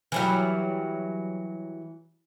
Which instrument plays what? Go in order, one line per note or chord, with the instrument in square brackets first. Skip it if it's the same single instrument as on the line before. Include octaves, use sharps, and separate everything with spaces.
[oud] E3 F#3 G3